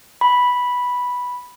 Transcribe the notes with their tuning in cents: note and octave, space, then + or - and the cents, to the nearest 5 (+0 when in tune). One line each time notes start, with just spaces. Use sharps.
B5 -5